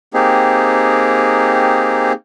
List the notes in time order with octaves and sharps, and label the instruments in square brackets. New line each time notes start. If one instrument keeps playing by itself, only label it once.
[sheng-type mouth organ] A#3 C4 D#4 G4 G#4